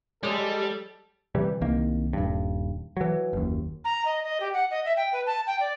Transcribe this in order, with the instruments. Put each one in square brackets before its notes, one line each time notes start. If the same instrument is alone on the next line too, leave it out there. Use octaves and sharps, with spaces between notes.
[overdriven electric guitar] G3 [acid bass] G#3 [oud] G4 C#5 D5 [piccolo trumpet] A4
[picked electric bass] C3 E3 G3
C2 D#3 A#3
D#1 G2
E3 F#3
F#1 D#2
[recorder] A#5
D#5
D#5
G4
F#5
D#5
E5
G5
B4
A5
G5
D5